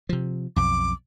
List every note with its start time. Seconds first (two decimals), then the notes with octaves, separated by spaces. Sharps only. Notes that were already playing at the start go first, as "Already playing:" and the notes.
0.09 C3 F3
0.56 B1 F2 D6